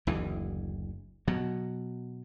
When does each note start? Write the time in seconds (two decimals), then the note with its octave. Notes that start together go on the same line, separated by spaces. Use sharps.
0.07 F#1 D2 E3
1.27 B2 F#3